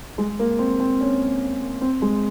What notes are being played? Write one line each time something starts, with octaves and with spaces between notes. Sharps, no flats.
G#3
A#3
C4
C4
C#4
C4
G#3